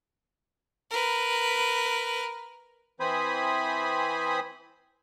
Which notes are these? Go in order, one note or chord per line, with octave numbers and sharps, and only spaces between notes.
A#4 B4
E3 C4 C5 G#5 B5 D#6